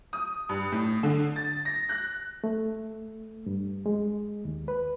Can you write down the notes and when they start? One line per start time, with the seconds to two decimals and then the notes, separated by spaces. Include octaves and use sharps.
0.13 D#6
0.49 G2
0.72 A2
1.03 D3
1.36 A6
1.65 A#6
1.89 F#6
2.44 A3
3.46 G2
3.86 G#3
4.45 D#2
4.68 B4